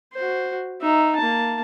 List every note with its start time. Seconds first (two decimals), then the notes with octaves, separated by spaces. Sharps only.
0.14 F#4 C5
0.82 D#4 E5
1.16 A#3 A5